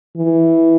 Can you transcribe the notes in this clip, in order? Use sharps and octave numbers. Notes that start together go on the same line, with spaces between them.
E3